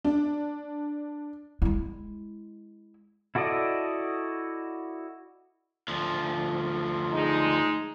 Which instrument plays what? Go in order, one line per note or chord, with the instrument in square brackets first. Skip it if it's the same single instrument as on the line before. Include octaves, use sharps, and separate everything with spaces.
[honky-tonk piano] D4
[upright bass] G#3 E4
[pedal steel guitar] E4 F#4 A4 D5 D#5
[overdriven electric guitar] D2 F3
[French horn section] G#3 D#4